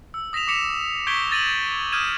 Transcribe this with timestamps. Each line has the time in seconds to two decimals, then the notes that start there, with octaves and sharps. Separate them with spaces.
0.14 E6
0.33 D#6 A#6 B6 E7 F7
0.48 D6 B6 C#7 E7 F7
1.07 C#6 G6 G#6 B6 D7 G7
1.32 A6 A#6 D#7 E7 F#7
1.92 D#6 F6 G6 G#6 D#7 E7